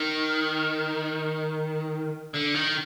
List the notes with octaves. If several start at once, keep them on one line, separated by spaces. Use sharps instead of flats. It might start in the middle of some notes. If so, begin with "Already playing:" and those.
Already playing: D#3
D3
D#3